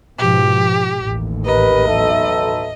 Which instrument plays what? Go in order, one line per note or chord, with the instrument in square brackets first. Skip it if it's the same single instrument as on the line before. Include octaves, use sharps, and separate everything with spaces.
[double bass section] G#2 B2 F3 [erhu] G4
[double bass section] A1 D#2
[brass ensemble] G4 A#4 B4 [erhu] D#5
[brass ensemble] B1 A4 E5